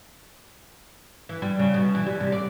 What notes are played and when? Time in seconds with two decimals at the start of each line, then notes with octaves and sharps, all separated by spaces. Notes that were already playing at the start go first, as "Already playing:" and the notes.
1.29 E3
1.42 G3
1.59 C#3
1.74 B2
1.95 E3
2.06 G3
2.20 C3
2.32 D5